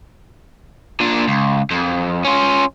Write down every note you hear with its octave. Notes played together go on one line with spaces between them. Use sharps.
A#2 D4
C#2
F2
C#4 F4